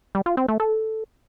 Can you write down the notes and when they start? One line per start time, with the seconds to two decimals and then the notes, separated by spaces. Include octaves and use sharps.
0.15 G3
0.26 F4
0.37 C4
0.48 A3
0.60 A4